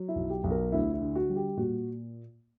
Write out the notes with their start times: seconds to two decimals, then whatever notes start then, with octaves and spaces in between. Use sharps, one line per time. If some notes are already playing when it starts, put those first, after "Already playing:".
Already playing: F#3
0.08 E4
0.16 B1
0.30 G4
0.44 B1
0.51 A#4
0.72 D2 E4
0.94 E4
1.01 D3
1.15 F#4
1.29 G3
1.36 G4
1.57 A#2 F#4